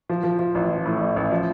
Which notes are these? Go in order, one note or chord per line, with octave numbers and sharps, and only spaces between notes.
F3
F3
F3
A1
F3
A2
A1
A1
F3